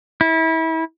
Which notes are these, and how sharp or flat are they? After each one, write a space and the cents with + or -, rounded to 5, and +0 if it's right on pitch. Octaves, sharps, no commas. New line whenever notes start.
E4 -30